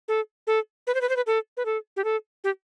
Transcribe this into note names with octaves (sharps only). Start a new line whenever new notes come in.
A4
A4
B4
C5
B4
C5
B4
A4
B4
A4
G4
A4
G4